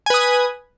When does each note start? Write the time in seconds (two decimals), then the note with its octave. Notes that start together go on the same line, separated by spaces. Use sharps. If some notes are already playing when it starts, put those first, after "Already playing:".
0.06 G#5
0.10 B4
0.14 D#6